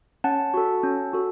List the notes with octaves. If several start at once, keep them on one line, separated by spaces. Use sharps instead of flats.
C#4 F#5 A5
F#4 A4
C#4
F#4 A4